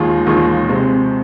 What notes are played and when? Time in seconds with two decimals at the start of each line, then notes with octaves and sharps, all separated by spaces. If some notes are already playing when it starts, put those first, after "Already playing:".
Already playing: D#2 D#3 G#3 F4
0.27 D#2 D#3 G#3 F4
0.68 C3 G#3 C4